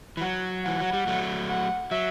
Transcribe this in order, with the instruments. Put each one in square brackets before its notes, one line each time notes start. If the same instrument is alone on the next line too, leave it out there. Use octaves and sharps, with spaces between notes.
[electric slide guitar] E3
[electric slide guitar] F#3 [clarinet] F#5
[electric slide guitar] E3 [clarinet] F#5
[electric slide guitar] F#3
G3
F#3 A3
[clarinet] F#5
[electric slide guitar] F#3 [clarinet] E5